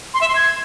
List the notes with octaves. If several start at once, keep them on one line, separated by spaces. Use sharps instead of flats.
C6
E5
C6
G#6